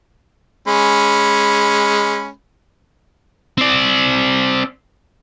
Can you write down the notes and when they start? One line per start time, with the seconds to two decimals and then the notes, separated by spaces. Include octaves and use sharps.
0.68 G#3 C#4 B5
3.58 C4 D5